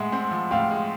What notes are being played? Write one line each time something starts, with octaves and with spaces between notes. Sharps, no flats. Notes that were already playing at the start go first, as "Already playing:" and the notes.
Already playing: A2 G#3 E5 F#5
C4
F3
A2 F5 G5
G#3